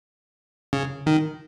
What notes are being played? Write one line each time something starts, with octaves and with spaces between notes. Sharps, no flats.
C#3
D#3